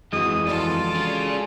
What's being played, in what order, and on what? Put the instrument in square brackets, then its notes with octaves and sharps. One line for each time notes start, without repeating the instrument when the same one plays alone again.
[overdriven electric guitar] F2 E3 [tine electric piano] G#3 F#4 [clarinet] D#6
[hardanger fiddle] F4 A4 [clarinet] D5
[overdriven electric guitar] C#4 G#4